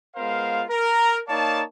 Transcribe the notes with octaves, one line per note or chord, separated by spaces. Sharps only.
G#3 B3 F4 A#4 C5 F5
A#4
A#3 D#4 C#5 D5 F5 A5